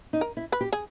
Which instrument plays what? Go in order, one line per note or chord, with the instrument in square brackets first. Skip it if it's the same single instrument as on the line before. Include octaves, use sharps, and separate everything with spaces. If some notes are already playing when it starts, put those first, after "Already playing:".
[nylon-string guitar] D#4
[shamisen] A#4
[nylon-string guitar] E4
[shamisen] B4
[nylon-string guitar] G4
[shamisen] G#4